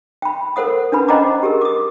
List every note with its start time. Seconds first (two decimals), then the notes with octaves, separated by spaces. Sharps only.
0.22 G5 B5
0.56 A4 A#4 C5 F#5 D#6
0.92 C#4 D4 B4 B5
1.08 C5 D#5 F#5 G5 A#5 D6
1.43 G4 G#4 A#4
1.61 D6 D#6